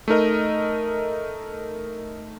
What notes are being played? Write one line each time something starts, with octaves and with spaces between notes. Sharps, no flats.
A3 D#4 A#4 D#5